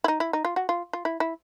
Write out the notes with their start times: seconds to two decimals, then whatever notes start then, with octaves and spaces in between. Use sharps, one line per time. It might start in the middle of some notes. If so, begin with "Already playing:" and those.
0.04 E4
0.08 D#4
0.20 E4
0.33 D#4
0.45 F4
0.56 F#4
0.69 F4
0.93 F4
1.05 E4
1.20 E4